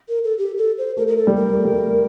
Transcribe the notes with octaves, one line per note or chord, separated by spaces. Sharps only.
A#4
A4
G4
A4
C5
A3 A#4
A#4
A4
G3
A#4
A3
G3
A3